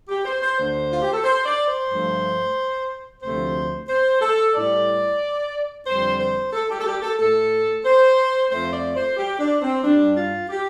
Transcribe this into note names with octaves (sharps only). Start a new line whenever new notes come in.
G4
C5
C5
D2 D3 A3 C5
F4
G4
A4
C5
D5
C5
G2 F3 A3
D2 C3 F3 A3 C5
C5
A4
A2 G3 D5
F2 D3 G3 C5
C5
A4
G4
A4
G4
A4
A2 A3 A4
C5
F2 F3 A3 C5
D5
C5
G4
D4
C4
G2 G3 D4
F4
G4